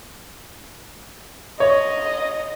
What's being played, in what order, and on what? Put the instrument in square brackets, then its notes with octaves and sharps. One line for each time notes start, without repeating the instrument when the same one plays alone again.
[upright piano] C#5 [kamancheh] D#5